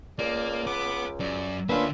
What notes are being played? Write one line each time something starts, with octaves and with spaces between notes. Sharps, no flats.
C#2 A#3 D5
B4 F#5 D6
F#2 D5
D3 A#3 C#4 D4 F4 B4 E5